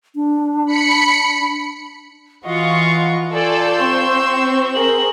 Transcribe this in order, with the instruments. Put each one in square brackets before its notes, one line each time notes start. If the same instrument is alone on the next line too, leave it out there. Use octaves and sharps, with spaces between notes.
[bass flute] D4
[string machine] B5 C#7
[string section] E3 F4 C#6 [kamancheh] F#4 D#5 [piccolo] F#5
[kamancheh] F4 [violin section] A4 D5 [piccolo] G#5 [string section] C6 E6 G6
[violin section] C4 [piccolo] C#6
[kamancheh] G#4 A#4 [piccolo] F#7